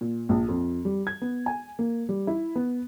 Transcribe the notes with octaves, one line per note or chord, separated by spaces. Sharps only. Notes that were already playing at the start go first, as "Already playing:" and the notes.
A#2
A#1
F2
G3
G#6
B3
G#5
A#3
G3
E4
B3